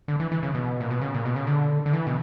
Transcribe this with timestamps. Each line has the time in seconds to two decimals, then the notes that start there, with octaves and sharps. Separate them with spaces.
0.08 D3
0.20 E3
0.32 E3
0.43 C#3
0.55 B2
0.80 A#2
0.90 B2
1.01 C#3
1.14 A#2
1.25 B2
1.36 C#3
1.47 D3
1.86 D3
1.93 E3
2.07 B2